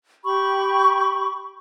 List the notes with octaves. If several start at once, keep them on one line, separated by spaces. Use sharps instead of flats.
G4 B5 C#6